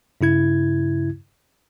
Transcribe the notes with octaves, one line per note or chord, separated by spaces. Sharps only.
G2 C#3 E4 G#6